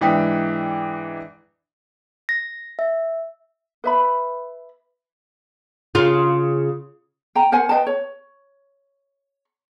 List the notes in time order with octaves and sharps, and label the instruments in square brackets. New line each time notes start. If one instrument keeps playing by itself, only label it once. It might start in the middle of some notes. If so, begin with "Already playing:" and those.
[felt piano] G#2 E3 D4 G5 D#6 B6
[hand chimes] A#6
E5
[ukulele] B4 E5 B5
[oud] C#3 F4
[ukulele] G5 A#5
A#4 C5 F#5 G#5
B4 D#5 G5 A5
C#5